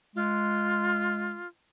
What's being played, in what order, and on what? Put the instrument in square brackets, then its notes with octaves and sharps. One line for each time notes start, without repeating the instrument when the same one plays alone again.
[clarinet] G#3 [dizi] F4